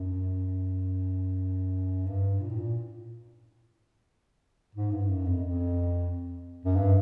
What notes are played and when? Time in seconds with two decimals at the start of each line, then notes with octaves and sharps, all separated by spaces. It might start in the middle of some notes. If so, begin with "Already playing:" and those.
Already playing: F#2
2.07 G2
2.40 A#2
2.49 A2
2.58 A#2
4.75 G#2
4.91 G2
5.09 F#2
5.26 F2
5.42 F2
6.65 F#2
6.77 G2